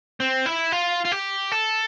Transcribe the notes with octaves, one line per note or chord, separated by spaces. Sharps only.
C4
E4
F4
F4
G4
A4